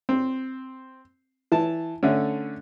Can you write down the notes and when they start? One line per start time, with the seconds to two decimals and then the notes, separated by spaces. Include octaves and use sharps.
0.09 C4
1.52 E3 A5
2.03 D3 A3 C#4